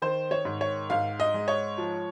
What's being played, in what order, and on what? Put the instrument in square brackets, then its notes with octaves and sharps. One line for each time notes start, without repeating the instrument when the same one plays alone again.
[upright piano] D#3 C5
C#5
G#2
C#5
G#2 F5
D#5
G#3
C#5
F3